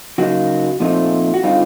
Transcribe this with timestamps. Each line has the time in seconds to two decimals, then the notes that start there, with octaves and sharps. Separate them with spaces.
0.18 C#3 F#3 A#3 D#4 F#4
0.80 A#2 F3 A3 C4 D#4
1.34 F#4
1.43 D3 G3 C4 D#4 F4